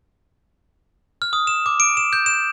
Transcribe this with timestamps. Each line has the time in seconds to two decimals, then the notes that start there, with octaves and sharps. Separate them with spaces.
1.22 F6
1.33 D#6
1.47 E7
1.66 D6
1.80 D7
1.97 E7
2.13 G6
2.26 E7